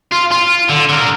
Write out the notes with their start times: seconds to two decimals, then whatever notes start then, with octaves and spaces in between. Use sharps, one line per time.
0.11 F4
0.31 F4
0.69 D3
0.89 D3 A#4